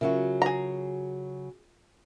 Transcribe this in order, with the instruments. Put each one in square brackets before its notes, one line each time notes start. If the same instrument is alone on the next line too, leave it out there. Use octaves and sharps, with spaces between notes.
[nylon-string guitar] C#3 F#3 F#4 [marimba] F4 A#4 E5
[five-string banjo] G#4 A#5